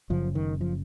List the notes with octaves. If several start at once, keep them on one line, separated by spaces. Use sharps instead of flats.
F#1 F#2 C#3 F3
D#3
F3